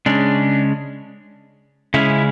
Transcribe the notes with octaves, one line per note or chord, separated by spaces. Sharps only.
C#3 G#3 C#4 D4
C#3 G#3 C#4 E4